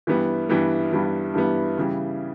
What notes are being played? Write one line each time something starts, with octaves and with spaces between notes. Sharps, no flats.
G2 E3 G3 B3
G2 E3 G3 B3
G2 E3 G3 B3
G2 E3 G3 B3
C#3 E3 G3